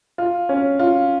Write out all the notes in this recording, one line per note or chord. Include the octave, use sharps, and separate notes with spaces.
F4
C#4
F4